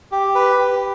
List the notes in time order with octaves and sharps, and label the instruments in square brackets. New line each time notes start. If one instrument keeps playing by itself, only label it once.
[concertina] G4
B4
G4